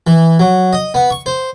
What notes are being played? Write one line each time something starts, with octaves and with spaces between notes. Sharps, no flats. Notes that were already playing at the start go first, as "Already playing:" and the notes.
E3
F#3
D#5
B3
C#6
C5